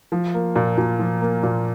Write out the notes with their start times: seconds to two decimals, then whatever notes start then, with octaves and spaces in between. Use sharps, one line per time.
0.12 F3
0.34 A#3
0.56 A#2
0.78 A#2
0.99 F3
1.21 A#3
1.43 A#2